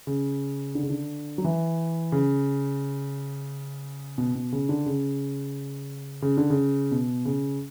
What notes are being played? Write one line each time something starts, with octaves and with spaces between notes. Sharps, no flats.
C#3
D3
C#3
D3
F#3
E3
C#3
B2
B2
C#3
D3
C#3
C#3
D3
C#3
B2
C#3